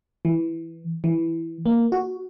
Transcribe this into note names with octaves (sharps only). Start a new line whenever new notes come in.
E3
E3
A#3
F#4